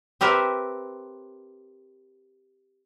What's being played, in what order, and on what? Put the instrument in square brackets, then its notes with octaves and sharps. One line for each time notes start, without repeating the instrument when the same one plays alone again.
[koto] C4 G4 A#4 B4 E5